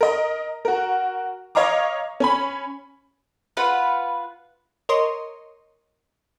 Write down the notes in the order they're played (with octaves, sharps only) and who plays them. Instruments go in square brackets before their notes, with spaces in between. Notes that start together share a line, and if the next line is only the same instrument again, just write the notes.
[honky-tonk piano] A#4 D#5
F#4 A#4
C#5 D#5 F5 A#5 D6
C#4 G#5 B5
[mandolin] F4 B4 F#5
[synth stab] A#4 C#5 D#5 C6